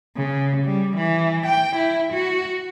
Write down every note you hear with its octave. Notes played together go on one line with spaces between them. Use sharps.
C#3
G3
E3
G5
E4
F#4